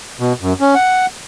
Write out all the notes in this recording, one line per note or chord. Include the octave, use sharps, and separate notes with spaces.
B2
F#2
C#4
F#5